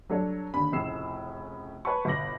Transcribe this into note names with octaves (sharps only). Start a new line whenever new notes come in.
F#3 G3 D4 A4 C#5
D#2 D3 B5
F1 A2 C#3 E6 C7 E7
B4 C#5 F#5 A5 B5 C#6
G1 B2 D6 A#6 F#7